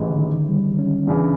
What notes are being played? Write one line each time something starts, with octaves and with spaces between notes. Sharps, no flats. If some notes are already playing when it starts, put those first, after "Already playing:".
Already playing: A1 G#2 E3
D3
D#3
G3
C#4
E2 C#3 E3 D4